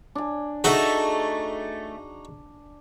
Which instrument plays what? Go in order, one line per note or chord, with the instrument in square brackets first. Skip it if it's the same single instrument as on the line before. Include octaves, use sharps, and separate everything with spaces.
[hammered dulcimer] D4 G#5
[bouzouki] A3 E5 [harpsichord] D#4 F#4 [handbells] G#4